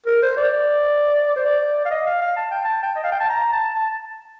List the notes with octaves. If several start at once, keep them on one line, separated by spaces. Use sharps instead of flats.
A#4
C5
D5
C5
D5
F5
D#5
F5
F5
A5
G5
A5
G5
D#5
F5
G5
A5
A#5
A5
A5